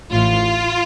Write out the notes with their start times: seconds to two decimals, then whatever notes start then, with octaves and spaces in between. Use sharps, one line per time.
0.11 A1 A2 E3 F4